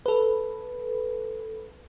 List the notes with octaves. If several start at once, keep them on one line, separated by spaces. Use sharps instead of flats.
A4 B4